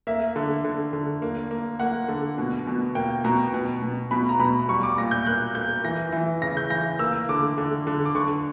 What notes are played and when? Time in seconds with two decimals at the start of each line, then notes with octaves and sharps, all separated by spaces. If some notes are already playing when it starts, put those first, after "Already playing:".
0.07 A#3 E5
0.36 D3
0.65 D3
0.93 D3
1.22 A#3
1.51 A#3
1.80 A#3 F#5
2.08 D3
2.38 B2
2.67 B2
2.95 A#3 G5
3.24 B2 A#5
3.54 B2
3.82 B2
4.11 B2 B5
4.29 A#5
4.39 B2 B5
4.69 G3 C#6
4.83 D6
4.98 A#2 A#6
5.11 G6
5.27 A#3 F#6
5.55 A#3 G6
5.84 E3 A#6
6.12 E3
6.41 C#3 A#6
6.57 G6
6.70 E3 A#6
6.99 A#3 E6
7.29 D3 D6
7.58 D3
7.87 D3
8.05 D6
8.15 D3 C#6